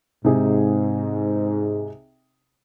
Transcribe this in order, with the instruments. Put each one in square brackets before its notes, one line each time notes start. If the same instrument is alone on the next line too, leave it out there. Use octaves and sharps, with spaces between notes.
[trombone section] G#2 [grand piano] C3 D#4 G#4